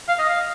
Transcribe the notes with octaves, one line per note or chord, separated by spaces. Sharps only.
F5
D#5
F5